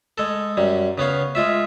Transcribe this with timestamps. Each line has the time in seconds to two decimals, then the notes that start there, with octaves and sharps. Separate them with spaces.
0.18 G#3 A4
0.57 F#2 G3
0.98 C#3 B3 C#5 F5
1.35 G#3 F4 E5